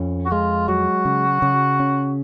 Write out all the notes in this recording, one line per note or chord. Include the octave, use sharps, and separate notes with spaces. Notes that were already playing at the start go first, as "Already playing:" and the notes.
Already playing: F2 C#4
F#4
G#3 F4
F#3 F#4
C#3
C#3
C#4